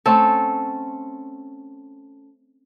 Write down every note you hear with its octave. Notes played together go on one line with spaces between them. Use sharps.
A3 C4 C#4 A4